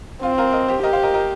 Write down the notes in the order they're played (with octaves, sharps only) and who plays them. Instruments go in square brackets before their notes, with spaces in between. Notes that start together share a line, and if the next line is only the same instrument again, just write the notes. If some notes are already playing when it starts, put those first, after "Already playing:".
[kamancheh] C4 [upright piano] F4
[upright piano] F4 A#4
A#4 D#5
G4 C5
[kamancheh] G4 [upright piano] A#4 D#5
[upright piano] C5 F5
A#4 D#5
A#4 D#5